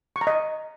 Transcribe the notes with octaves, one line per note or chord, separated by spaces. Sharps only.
C#6
A#5
D#5